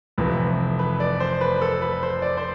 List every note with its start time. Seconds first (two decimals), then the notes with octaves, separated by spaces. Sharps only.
0.18 F1 F2 C3 E3 B4
0.79 B4
1.00 D5
1.20 C5
1.41 B4
1.61 A4
1.82 B4
2.03 C5
2.22 D5
2.37 C5